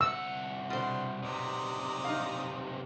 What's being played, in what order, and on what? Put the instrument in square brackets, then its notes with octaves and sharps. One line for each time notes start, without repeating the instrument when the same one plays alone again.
[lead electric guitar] C2 F#5 [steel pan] E6
[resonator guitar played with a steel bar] B2 C5 [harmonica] D4 C6
[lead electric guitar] B1 C3 [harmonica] D5 A#5 D#6
[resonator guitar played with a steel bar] D#4 F5